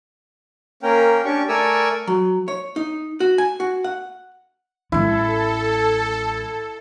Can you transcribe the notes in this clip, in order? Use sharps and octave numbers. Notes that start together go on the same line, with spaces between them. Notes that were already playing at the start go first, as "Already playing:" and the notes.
A#3 C#4 A#4 G5
C#4 D4 G4 C#6
A3 A#4 D5 G#5 C#6 E6
F#3
C#5
D#4
F#4
G#5
F#4
F#5
A1 G#3 E4 A4